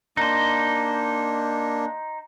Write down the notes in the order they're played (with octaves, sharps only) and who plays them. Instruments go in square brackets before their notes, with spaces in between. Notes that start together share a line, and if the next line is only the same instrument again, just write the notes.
[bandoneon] A#3 D4 [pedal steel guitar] D#4 C5